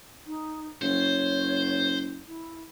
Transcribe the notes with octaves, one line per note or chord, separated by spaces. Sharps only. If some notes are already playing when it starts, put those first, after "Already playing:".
D#4
F#1 C5 C#5
E4